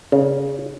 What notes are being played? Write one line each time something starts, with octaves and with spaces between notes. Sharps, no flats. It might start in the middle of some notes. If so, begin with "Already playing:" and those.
C#3